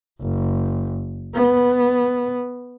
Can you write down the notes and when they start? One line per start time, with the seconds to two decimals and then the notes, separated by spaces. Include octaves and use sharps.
0.21 F#1
1.34 B3